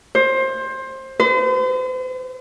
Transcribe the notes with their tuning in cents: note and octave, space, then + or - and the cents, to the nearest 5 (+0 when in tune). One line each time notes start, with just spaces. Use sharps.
C5 +20
C5 -45